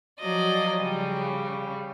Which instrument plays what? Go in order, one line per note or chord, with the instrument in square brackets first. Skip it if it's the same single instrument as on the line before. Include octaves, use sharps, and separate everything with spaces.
[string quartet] F3 F#3 D5 D#5
C#3 G3